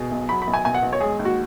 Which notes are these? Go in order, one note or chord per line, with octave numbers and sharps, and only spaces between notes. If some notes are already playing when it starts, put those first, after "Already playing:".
Already playing: B2 G#4
B1
F#3 B5
B5
B1
G#5
B2 G#5
F#5
B1
C#5
G#3 G#4
D#2
F#4